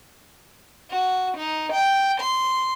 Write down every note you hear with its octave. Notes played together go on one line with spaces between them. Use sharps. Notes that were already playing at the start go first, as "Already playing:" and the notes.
F#4
D#4
G5
C6